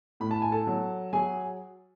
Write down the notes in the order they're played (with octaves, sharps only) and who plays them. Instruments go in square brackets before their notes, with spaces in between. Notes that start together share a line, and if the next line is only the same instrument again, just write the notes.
[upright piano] A2 B5
A5
G#5
A4 A5
F#3
F#3 G#4 G#5